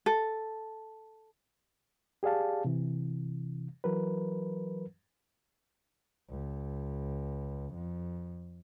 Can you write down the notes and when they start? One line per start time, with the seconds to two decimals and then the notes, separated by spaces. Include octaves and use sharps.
0.06 A4
2.23 G4 G#4 D5 F5 A5
2.65 C3 E3
3.84 E3 F#3 A#4 B4
6.30 C#2
7.74 F2